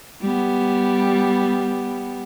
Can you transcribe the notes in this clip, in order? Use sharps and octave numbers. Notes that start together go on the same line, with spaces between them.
G3 B3